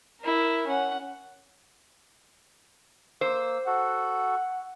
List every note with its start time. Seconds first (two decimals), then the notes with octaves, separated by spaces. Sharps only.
0.21 E4 A#4
0.67 C#4 F#5
3.21 A#3 C5 E6
3.67 F#4 A4 F#5